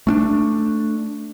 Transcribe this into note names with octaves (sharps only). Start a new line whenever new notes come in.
A3 C#4 D4